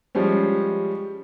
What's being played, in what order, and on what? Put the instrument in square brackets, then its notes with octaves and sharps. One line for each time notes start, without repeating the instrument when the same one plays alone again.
[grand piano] F3 G3 G#3 C#4